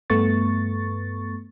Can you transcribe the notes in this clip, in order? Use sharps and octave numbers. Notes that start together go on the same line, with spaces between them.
G2 A3 B3 C#6 A6